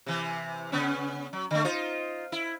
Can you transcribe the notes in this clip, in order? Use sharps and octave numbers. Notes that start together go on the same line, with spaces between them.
C3 E3
C#3 B3 C#4
F#3
D3 A3
D#4 F4 C5
E4